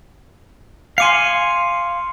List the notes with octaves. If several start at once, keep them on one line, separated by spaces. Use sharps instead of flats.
F5 G#5 C6 D6 C#7